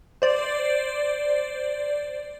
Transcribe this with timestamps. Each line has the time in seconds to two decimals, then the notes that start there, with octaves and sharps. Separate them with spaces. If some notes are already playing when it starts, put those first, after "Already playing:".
0.22 C5 D5